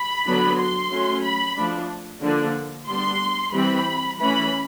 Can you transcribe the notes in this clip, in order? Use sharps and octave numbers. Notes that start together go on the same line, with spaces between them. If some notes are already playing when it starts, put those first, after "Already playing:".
Already playing: B5
D3 F#3 B3 D4
C6
F#3 A3 C#4
B5
F3 A3 D4
D3 F3 A#3 D4
G3 B3 D4 C6
E3 G3 C4 B5
E3 A3 C#4 B5